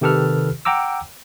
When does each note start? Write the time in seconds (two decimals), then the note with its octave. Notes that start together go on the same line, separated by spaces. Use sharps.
0.01 C3 D#3 G4 A4 B4 F6
0.65 F#5 G5 A#5 D6 E6